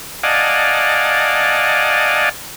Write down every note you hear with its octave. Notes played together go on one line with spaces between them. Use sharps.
D5 D#5 F5 F#5 G#5 A5